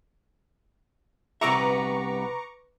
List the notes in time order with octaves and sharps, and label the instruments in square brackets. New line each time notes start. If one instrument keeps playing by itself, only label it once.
[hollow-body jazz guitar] C2 B3 E5 [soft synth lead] B4 [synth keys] A#5 C#6 D6